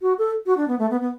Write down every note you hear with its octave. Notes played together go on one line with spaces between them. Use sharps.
F#4
A4
F#4
D4
B3
A3
B3
B3